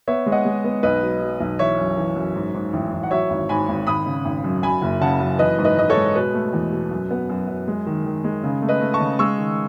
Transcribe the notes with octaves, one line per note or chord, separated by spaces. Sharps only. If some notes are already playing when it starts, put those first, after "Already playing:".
B3 C#5 E5
G#3
D#5 F#5
G#3
B3
B1 B4 D#5
F#3
F#3
B1
E3 C#5 E5
F#2
E3
F#2
G#2
G#2
A1
A1
F#5
F#3 C#5 E5
G#1
G#2 G#5 B5
G#1
G#1 B5 D#6
C#3
G#1
F#2
F#2 G#5 B5
F#1
C#3 F#5 A5
F#2
E3 B4 D#5
G#2
B4 D#5
G#2 D#5
A4 C#5
G#3
B2 B4
A3
E2
B2
F#2
B3
F#2
F#2
G#3
D#3
D#3
G#3
C#3
A3
B4 D#5
A3
A5 C#6
C#3
G#3 C#6 E6
D#3